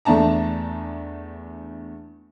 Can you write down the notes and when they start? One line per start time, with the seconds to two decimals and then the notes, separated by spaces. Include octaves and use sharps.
0.05 E2 A3 D4 A5 A#5